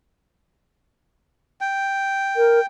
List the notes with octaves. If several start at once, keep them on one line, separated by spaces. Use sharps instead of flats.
G5
A#4